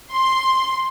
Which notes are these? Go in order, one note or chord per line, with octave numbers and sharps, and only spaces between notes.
C6